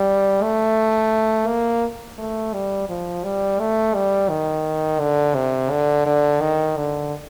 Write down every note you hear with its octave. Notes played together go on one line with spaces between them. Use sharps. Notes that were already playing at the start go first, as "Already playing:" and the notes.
Already playing: G3
A3
A#3
A3
G3
F3
G3
A3
G3
D#3
D3
C3
D3
D3
D#3
D3